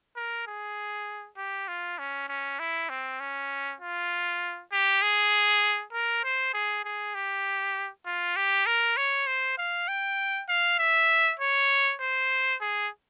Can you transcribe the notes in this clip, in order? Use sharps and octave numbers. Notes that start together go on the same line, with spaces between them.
A#4
G#4
G4
F4
C#4
C#4
E4
C4
C#4
F4
G4
G#4
A#4
C5
G#4
G#4
G4
F4
G4
A#4
C#5
C5
F5
G5
F5
E5
C#5
C5
G#4